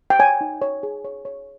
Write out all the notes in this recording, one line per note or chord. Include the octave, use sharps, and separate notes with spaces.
G5
C#5 G#5
D#4
C#5
G#4
C#5
C#5